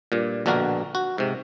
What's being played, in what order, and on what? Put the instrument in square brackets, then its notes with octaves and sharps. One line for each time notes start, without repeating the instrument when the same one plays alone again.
[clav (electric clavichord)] G2 A#2
A#1 B2 D3 A#3 F#4 A#4
F#4
G#2 C3